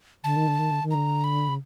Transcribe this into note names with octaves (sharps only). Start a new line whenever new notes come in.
D3 A5
D#3
D3
D#3
D3
D#3
D3 A#5
B5
C#3